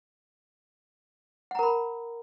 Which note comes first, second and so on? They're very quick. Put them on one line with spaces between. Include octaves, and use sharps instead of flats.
F#5 A#5 A#4 B5